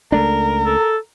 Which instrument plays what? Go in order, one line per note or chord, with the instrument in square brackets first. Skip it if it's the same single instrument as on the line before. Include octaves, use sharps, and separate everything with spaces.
[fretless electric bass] C#2 A3 D4 [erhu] A#4
[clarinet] A4